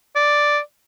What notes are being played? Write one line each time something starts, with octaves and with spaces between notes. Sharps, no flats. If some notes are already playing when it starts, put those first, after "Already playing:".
D5